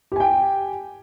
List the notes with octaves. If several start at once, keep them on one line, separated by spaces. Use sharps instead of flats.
G4 G5 G#5